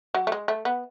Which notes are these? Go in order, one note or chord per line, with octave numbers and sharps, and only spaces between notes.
F#3
A3
G#3
A3
B3